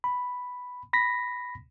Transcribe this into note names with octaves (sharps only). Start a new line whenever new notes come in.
B5
B5 A#6 B6